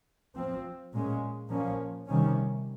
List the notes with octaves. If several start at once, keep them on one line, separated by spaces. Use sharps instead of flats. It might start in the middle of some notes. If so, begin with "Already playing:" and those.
F3 C4
A#2 G#3 C#4
A#2 F3 A#3 C#4
C3 D#3 G3 C#4